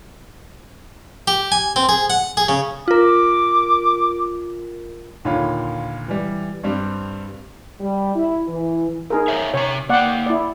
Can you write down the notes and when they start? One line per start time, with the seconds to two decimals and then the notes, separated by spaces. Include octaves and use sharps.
1.28 G4
1.52 G#5
1.76 C4
1.89 G#4
2.10 F#5
2.37 G#4
2.49 C#3
2.88 F4 A#4 D6
5.25 D#2 A#2 D3 F4 C#5 B5
6.08 E3 G3
6.63 G2 G3 C4
7.80 G3
8.15 E4
8.49 E3
9.10 D#4 G#4 A#4
9.28 C5 C#5 E5
9.54 C3 C#5 A#5
9.89 A#3 D5 F#5 G5
10.26 E4 D5